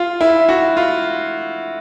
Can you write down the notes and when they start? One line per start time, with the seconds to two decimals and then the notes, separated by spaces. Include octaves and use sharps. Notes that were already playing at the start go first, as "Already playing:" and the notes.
Already playing: F4
0.21 E4
0.49 F#4
0.77 F4